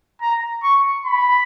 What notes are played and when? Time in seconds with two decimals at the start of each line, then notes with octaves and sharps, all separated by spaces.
0.21 A#5
0.63 C#6
1.05 B5